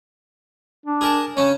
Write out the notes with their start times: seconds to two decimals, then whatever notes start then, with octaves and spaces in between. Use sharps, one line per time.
0.86 D4
1.01 G#4 A#4 A5
1.37 C#3 C#4 C#5